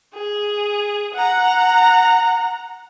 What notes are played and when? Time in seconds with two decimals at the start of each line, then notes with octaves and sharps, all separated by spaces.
0.14 G#4
1.14 F#5 A#5